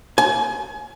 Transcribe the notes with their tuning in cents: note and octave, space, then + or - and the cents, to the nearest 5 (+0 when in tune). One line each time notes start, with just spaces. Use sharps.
G#5 +30